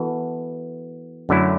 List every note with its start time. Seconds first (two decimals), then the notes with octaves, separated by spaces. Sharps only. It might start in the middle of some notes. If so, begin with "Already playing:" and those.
Already playing: E3 B3 F#4 A4
1.29 F#2 D3 F#3 A3 E4